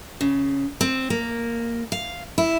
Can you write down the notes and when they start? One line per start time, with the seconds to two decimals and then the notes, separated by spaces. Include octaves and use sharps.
0.21 C#3
0.81 C4
1.10 A#3
1.92 F5
2.38 E4